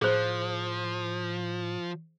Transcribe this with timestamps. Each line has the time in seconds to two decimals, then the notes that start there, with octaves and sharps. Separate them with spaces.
0.02 A2 F3 G#4 C5